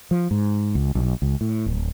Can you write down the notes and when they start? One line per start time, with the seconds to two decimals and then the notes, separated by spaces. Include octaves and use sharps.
0.11 F3
0.31 G#2
0.75 C#2
0.95 B1
1.22 C#2
1.41 A2
1.66 D1